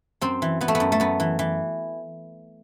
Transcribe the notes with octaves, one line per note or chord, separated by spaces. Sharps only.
F#2 C4
E3
E3 B3
A3
B3
F#2
A3
F#2 B3
E3
E3